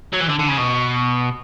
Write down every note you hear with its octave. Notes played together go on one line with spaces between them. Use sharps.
F#3
E3
D3
D3
C#3
B2